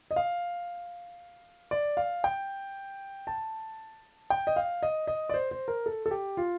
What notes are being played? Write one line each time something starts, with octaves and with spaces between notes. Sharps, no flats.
D#5
F5
D5
F5
G5
A5
G5
D#5
F5
D#5
D#5
D5
C5
C5
A#4
A4
A4
G4
F4